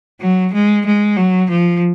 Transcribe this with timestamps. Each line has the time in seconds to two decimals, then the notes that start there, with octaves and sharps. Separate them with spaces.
0.20 F#3
0.53 G#3
0.86 G#3
1.17 F#3
1.50 F3